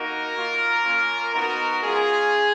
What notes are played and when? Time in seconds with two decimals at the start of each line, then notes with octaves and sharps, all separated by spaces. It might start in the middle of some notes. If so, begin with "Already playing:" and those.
Already playing: A#3 D#4 F#4 A#4
0.34 A#3 F4
0.84 A#3 C#4 F4
1.34 B3 D#4 F#4 A#4
1.83 G#3 C#4 F4 G#4